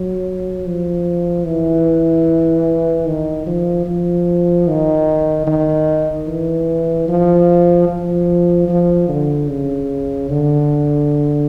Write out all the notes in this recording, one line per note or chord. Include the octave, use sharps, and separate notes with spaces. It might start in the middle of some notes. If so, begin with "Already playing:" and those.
Already playing: F#3
F3
E3
D#3
F3
F3
D#3
D#3
E3
F3
F3
F3
D3
C#3
D3